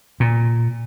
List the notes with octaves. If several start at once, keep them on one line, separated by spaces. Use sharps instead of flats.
A#2